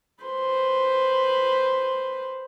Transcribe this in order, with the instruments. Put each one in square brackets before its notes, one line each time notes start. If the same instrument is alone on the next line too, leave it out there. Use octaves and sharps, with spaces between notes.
[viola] B4 C5